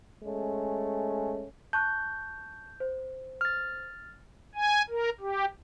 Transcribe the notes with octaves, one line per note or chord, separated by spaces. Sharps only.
G#3 A3 C#4
A5 C#6 F#6 G6
C5
F6 A6
G#5
A#4
G4